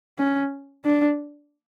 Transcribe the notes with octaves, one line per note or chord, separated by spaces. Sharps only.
C#4
D4